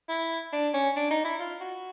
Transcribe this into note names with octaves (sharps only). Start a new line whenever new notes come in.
E4
D4
C#4
D4
D#4
E4
F4
F#4